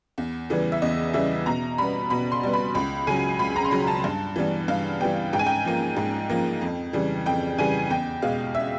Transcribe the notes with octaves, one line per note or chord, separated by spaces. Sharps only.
E2
C#3 E3 G3 B3
E5
E2 D#5
C#3 E3 G3 B3 E5
B2 A#5
G3 B3 B5
B2 B5
C6
G3 B3
B5
C#2 B5
C#3 F#3 G#5
C#2 B5
A#5
C6
C#3 F#3 B5
A5
G2
E3 G3 B3
G2 F5
E3 G3 B3 G5
G#2 G5
G#5
G5
F3 A#3
G#2
F3 A#3
F2
C#3 E3 G3
F2 G5
C#3 E3 G3 G#5
E2 G5
B2 G#3 F5
E5